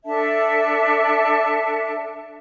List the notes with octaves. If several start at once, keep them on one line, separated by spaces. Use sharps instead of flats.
D4 A4 E5 A5